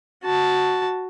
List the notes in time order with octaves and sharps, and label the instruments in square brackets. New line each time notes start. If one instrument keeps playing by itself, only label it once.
[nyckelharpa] F#4 A5